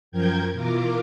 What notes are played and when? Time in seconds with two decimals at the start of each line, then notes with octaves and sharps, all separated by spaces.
0.11 F#2 F3 A#4 G5 G6 G#6
0.52 B2 E3 F4 A#4 D6